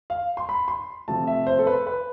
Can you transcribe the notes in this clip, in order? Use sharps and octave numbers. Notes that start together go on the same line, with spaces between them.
F5
C6
B5
C6
C3 F3 A3 A5
E5
C5
A4
B4
B4